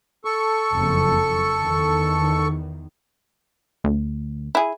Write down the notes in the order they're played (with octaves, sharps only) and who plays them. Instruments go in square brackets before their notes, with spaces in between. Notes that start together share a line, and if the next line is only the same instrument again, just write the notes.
[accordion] A4 C#6
[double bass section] F#1 F2 F3
E2 D#3
[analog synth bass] D2
[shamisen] E4 G#4